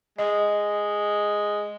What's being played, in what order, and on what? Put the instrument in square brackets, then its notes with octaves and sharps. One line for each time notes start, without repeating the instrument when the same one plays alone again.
[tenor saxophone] G#3 [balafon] D#5